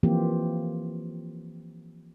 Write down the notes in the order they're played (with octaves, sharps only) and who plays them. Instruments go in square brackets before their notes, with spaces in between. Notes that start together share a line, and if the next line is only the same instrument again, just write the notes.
[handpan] E3 F3 A#3 C4 F4 G4